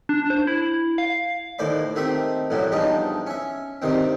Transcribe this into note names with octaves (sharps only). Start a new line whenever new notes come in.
D4
C5
E4
F5
D#2 A2 C5 D5 B5
D#3 A3 C4 G4 E5
A1 F#2 A2 F#3 G3
E2 F3 G3 D4 D#4
C#4 E5
G2 C3 D#3 C4